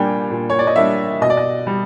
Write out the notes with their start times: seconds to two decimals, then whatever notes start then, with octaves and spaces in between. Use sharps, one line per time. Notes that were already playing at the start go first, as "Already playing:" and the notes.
Already playing: A#2 G3 A#3 D4 G5 G#5
0.31 A#2
0.50 C#5
0.59 D5
0.67 D#5
0.76 G3 A#3 D4 E5
1.21 B2 D#5
1.30 D5
1.37 D#5
1.67 G3